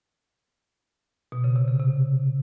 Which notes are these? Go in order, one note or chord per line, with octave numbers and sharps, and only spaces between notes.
B2
C#3
C3
C#3
C3